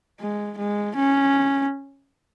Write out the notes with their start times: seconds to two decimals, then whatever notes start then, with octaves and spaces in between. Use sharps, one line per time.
0.20 G#3
0.58 G#3
0.96 C#4